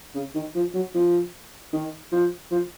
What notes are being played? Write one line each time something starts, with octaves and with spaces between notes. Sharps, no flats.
C#3
D#3
F3
F#3
F3
D#3
F3
F3